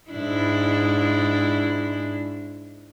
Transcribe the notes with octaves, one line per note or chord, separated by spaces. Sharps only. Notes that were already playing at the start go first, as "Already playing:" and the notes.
G#2 D4 E4